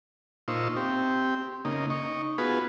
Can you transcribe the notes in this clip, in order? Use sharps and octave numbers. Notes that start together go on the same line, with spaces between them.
A#2 D#4 F4 C5 C#6 E6
C4 G4
C#3 A#3 D#4
D#4 C#6
B3 F4 F#4 G#4 B4